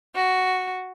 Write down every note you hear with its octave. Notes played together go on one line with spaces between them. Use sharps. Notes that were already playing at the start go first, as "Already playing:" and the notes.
F#4